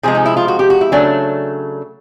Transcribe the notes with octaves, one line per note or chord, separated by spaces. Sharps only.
C3 F3 G#3 G#4
D#4
E4
F4
F#4
G4
F#4
E4
C#3 F#3 A3 D4